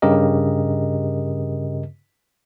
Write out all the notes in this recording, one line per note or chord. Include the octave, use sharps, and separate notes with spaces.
G2 C#3 G4 A#4 D#5